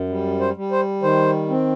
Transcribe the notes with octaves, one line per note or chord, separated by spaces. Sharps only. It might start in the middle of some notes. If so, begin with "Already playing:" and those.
Already playing: F#2
G3
C5
G3
C5
D#3 C5
C4